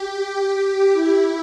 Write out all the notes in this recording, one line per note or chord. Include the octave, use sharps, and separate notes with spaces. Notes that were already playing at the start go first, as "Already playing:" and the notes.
Already playing: G4
E4